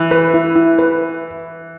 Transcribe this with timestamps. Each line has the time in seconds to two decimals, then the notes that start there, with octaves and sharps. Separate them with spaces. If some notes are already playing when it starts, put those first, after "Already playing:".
Already playing: E3
0.11 B4
0.34 E4
0.56 E4
0.79 B4